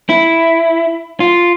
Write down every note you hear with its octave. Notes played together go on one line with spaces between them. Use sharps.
E4
F4